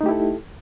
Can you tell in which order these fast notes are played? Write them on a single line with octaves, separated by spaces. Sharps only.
D#4 A3 G4 E4 A4